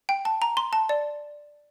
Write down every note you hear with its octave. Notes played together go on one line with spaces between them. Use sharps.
G5
A5
A#5
C6
A5
D5